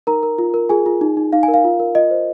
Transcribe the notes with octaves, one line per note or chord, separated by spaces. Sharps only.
D#4 A#4 A#5
A#4
F4
A#4
F4 G#4 G#5
F4
D#4
D#4
D#4 F5
G#5
A#4
F5
F4
A#4
F4 D#5
C5